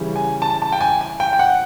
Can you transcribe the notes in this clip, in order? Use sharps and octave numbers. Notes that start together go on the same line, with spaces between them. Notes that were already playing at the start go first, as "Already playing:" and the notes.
Already playing: C#3 E3 G3
G#5
A5
A5
G5
G#5
G#5
G5
G5
F#5